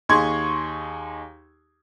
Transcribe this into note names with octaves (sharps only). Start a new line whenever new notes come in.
D#2 D#4 G#4 C6 C#6 G#6